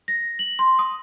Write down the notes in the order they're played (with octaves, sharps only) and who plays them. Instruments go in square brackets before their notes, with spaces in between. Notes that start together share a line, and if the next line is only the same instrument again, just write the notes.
[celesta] A#6
F#7
C6
D#6